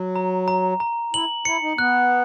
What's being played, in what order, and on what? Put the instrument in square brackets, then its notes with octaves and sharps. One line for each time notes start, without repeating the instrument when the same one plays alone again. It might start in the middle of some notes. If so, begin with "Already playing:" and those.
Already playing: [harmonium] F#3
[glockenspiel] A#5
A#5
A#5
[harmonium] E4 [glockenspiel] F#7
[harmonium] E4 [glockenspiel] C#7
[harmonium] D#4
[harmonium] B3 [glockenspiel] F#6